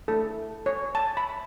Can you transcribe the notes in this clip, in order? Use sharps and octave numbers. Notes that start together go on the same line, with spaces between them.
A3 E4 A4
C#5
A5
B5